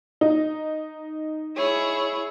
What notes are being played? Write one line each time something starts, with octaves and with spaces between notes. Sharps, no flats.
D#4
E4 G#4 C#5